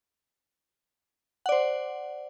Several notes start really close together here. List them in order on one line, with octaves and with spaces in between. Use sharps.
F#5 D5 C5